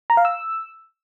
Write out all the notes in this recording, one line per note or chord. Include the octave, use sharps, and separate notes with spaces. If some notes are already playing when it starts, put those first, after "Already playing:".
A#5
F5
E6